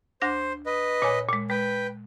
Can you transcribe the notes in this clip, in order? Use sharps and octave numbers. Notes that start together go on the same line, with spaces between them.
D2 D4 C5 A#6
B4 D#5
A#2 C#5 G#5
A#2 G#3
G#3 B4 G5